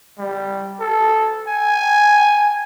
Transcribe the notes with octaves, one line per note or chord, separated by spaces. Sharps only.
G3
A4
G#5